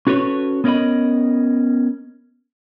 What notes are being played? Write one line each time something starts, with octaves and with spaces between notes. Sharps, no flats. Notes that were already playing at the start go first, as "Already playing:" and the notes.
C#4 F#4 A4 B4 C#5
B3 C#4 A#4 D5 D#5 B5